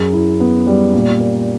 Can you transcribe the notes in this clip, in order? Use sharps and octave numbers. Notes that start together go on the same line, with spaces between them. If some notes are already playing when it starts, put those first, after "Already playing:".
Already playing: F#2 G#4
E4
B3
G3
A#2
A#3